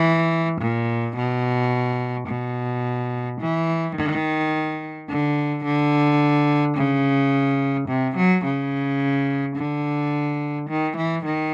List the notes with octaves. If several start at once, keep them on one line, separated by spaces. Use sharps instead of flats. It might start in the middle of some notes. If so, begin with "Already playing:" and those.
Already playing: E3
A#2
B2
B2
E3
D#3
D3
D3
C#3
C3
F#3
C#3
D3
D#3
E3
D#3